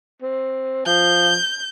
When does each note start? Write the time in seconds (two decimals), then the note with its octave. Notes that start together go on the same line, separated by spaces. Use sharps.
0.22 C4
0.86 F3 G6